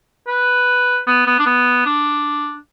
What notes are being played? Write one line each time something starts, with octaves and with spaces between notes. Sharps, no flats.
B4
B3
B3
D4
B3
D4